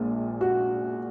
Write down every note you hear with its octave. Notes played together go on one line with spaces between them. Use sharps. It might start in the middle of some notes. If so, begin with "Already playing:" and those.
Already playing: A#1 A#2 G#3
F#4